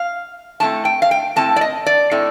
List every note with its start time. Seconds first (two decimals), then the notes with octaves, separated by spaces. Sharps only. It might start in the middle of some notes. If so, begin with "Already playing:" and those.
Already playing: F5
0.60 A2 A3 C4 A5
0.85 G5
1.02 F5
1.11 G5
1.36 A2 A3 C4 A5
1.56 D5
1.61 D#5
1.86 D5
2.11 A2 A3 C4